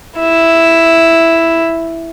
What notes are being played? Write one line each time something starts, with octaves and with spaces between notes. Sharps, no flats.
E4 E5